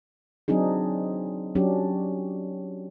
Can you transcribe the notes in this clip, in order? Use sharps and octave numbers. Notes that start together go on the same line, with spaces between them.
F#3 C4 D4 D#4 G#4
F#3 C#4 D4 G4